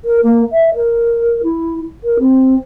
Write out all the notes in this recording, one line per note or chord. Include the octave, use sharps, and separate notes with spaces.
A#4
A#3
E5
A#4
E4
A#4
C4